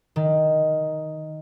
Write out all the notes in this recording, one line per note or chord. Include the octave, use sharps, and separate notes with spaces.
D#3